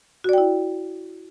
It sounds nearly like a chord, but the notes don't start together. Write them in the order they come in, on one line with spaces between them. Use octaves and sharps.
F#4 D5 G5 E4